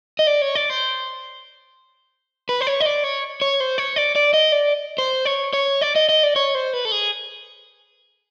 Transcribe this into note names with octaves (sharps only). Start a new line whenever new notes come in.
D#5
D5
C#5
D5
C5
B4
C5
C#5
D#5
D5
C#5
C#5
C5
C#5
D5
D5
D#5
D5
C5
C#5
C#5
D5
D#5
D#5
D5
C#5
C5
B4
A4
G#4